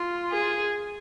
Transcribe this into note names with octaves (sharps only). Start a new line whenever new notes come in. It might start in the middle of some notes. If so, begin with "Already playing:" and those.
Already playing: F4
G#4